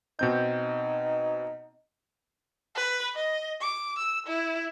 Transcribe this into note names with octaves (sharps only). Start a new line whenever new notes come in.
B2 C4 D#4 G6
B4
D#5
D6
E6
E4